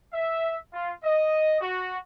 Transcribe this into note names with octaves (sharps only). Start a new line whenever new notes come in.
E5
F4
D#5
F#4